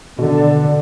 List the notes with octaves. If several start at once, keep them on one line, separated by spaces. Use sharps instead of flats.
B2 D3